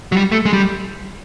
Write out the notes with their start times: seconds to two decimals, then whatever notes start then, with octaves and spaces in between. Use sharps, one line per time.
0.12 F#3
0.17 G3
0.32 A3
0.45 G#3
0.53 G3